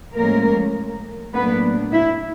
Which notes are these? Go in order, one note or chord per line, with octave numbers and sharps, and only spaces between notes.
A2 F3 G#3 A#3 C#4 A#4
A2 F#3 A#3 B3 D4 B4
E4 E5